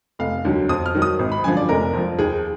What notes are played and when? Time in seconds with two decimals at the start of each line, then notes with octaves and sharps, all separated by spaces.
0.19 F1 F5
0.45 D#2 D3 F#3
0.69 F2 D#6
0.86 F6
0.95 D#3 F#3
1.02 D#6
1.19 G#1
1.32 B5
1.44 F#2 D3 F3 G#5
1.57 D5
1.69 F1 A#4
1.93 F2 F3
2.19 D#2 G#4